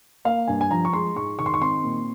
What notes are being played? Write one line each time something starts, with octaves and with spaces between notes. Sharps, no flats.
A#3 F5
G2 G#5
G#5
F3 A#5
C#6
G#3 C6
G#2 C#6
D#3 C#6
C6
C#6
C4 C6
A#2